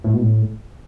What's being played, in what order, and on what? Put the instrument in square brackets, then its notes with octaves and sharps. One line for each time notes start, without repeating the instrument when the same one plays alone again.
[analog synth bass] A2
B2
A2